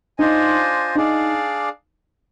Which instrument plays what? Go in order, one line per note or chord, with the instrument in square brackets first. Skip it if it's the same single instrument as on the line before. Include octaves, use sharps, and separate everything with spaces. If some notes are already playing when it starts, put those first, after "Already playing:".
[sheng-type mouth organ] D4 F4 C5 D#5 G#5 [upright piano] D#4
[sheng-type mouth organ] D4 G#4 D5 F5 [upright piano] D#4